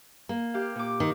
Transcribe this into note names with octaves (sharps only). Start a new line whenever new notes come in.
A#3
G4 F5
A#2 D6
D#3